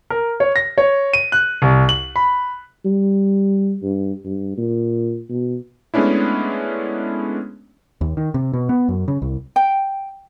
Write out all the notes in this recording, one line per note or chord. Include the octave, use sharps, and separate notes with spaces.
A#4
C#5
A#6
C#5
D#7
F#6
C2
F#7
B5
G3
G2
G2
A#2
B2
G#3 A3 B3 C#4 D4 E4
D#2
D#3
C3
B2
B3
F#2
C#3
C2
G5